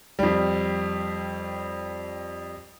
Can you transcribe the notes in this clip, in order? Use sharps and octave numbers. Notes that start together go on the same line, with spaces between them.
F2 G3